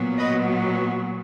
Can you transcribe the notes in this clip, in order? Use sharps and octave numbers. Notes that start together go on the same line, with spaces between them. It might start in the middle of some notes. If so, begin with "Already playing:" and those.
Already playing: A#2 F#3 B3
B4 D#5